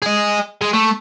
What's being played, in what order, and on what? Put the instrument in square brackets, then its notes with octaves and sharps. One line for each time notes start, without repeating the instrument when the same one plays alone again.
[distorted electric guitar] G#4 D#5
G#3
A3